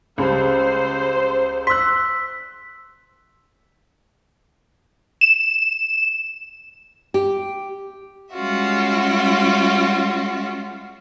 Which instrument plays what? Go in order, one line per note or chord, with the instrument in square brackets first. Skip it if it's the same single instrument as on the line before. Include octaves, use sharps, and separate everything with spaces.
[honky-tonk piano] C#2 G3 [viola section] C5
[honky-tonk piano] C6 F#6 [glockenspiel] E6 B6
[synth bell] E7
[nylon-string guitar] G4
[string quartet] G3 G#3 C#4 F4 F#4 E5